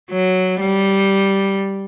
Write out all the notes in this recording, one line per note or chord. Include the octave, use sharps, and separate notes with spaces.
F#3
G3